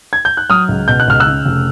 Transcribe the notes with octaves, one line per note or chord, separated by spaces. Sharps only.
G#6
G6
F#6
F#3 D#6 F6
C#2
B2 G6
F#6
C#2 F6
E6 F#6
C#3
F1